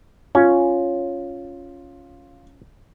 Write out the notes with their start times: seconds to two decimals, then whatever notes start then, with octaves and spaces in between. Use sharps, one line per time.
0.35 C#4 F4